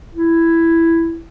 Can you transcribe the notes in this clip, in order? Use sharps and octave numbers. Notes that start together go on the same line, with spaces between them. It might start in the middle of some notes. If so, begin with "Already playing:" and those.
E4